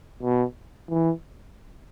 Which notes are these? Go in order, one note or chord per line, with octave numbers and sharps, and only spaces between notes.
B2
E3